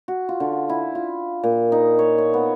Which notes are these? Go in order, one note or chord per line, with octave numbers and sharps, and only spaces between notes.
F#4
F4
D3
E4
F4
A#2
D#4
C#5
C#5
B3